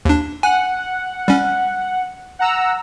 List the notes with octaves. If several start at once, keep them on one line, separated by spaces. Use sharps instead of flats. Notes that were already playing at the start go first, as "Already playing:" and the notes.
D#2 D4
F#5 G#5
G3 C#4
F#5 A#5 E6